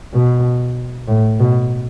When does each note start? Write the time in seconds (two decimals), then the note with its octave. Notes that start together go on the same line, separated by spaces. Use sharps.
0.14 B2
1.08 A2
1.40 B2